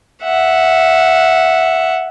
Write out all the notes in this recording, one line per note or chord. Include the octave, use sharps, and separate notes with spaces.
E5 F#5